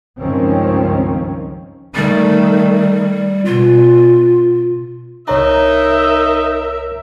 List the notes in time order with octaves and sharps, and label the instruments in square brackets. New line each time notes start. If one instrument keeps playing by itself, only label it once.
[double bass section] C#2 G2 D#3 F3 C4 C#4
[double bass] D#3 A3 [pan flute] G3
[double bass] B2 [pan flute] F4
[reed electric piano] C2 C#5 A#5 [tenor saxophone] D#4 [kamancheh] A#4 E5